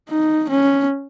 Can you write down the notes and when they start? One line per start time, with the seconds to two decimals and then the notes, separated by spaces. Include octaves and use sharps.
0.09 D#4
0.49 C#4